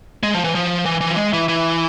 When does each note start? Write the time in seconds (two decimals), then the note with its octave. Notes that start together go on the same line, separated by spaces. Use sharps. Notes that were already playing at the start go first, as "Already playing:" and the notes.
0.23 G#3
0.34 F3
0.44 E3
0.55 F3
0.85 E3
1.01 E3
1.11 F3
1.16 G#3
1.33 E3
1.48 E3